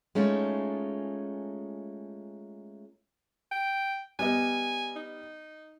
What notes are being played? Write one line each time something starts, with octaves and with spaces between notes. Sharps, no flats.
G#3 A3 C#4 D#4 F4 A4
G5
G3 B3 D#5 G#5
D#4